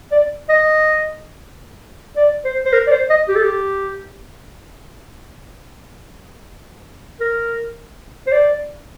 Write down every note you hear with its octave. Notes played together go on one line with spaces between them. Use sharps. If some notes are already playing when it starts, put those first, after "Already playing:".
D5
D#5
D5
C5
C5
A#4
D5
C5
D#5
G4
A4
G4
A#4
C5
D5